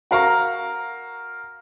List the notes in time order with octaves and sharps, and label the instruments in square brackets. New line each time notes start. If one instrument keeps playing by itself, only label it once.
[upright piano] F#4 A#4 F5 A#5 C#6